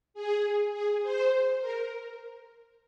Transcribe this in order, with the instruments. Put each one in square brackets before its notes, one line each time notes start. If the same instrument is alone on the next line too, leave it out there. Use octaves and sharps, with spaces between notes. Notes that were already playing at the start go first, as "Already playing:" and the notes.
[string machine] G#4
G#4
C5
A#4